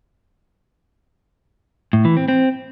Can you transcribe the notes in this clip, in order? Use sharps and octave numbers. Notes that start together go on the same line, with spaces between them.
A2
E3
C4
C4